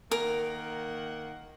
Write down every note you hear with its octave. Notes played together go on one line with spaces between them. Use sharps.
D#3 A#3 A#4 F#5